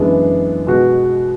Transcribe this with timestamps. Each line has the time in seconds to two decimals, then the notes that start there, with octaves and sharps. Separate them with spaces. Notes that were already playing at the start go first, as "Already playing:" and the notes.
Already playing: F#2 E3 G#3 B3 D4
0.66 B2 G#3 B3 F#4